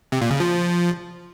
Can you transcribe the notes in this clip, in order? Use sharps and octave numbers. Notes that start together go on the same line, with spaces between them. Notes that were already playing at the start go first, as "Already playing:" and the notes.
C3
A#2
C#3
F3